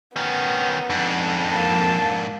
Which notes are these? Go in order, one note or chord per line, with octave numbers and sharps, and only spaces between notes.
D#3 B3 C#4
F2 G#2 D4
A#3 A5